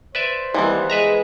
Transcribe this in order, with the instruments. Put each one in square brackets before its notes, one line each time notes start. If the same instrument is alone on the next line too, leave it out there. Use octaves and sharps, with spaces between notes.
[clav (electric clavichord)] B4 D5 E5 [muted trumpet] C5
[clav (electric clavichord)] D#2 C3 [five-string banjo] E3 B3 [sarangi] G3
[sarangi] G#3 [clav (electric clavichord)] B4 E5 A#5